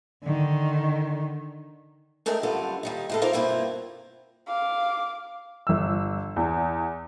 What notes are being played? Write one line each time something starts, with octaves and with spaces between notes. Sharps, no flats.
D3 D#3
G#3 A3 D4 G#4 A#4 G5
F#2 D3 G3 F4 A4 B4
D#2 G3 D#4
A2 G#3 A4
D#4 F4 A#4 C5 D5
G2 B2 A#3 C4 E4 F4
F5 D6
G1 E6
E2